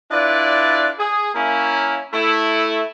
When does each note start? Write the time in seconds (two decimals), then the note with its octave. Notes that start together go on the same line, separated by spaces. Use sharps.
0.11 D4 E4 F4 B4 D5
0.98 G#4
1.35 A#3 C#4 E4
2.13 A3 E4